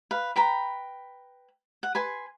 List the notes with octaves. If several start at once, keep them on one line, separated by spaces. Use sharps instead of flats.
B4 F5
B4 G5 A#5 B5
F#5
B4 G#5 C6